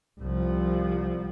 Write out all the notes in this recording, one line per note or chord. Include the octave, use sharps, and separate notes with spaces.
C2 F3